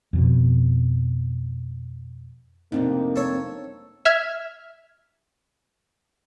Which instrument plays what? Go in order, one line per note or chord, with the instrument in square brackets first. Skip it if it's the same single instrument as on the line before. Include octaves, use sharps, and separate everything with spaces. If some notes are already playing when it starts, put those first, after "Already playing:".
[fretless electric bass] F2 B2 F3
[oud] F2 C3 A3 [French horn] A#3 [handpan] C4 D4 D#4
[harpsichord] A4 C#5
[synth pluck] E5 F6 G#6